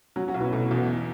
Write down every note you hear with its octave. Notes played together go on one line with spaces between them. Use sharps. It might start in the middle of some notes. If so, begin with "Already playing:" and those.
F#3 C#4 F#4
C#4 F#4
B1
B3 E4
B2 A3 C#4
E2
B3 E4